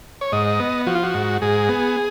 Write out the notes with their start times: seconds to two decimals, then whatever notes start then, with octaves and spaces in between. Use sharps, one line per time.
0.21 C#5
0.32 G#2 D#5
0.60 B3
0.87 F3 F#4
0.95 F4
1.03 F#4
1.14 G#2
1.42 G#2 G#4
1.69 B3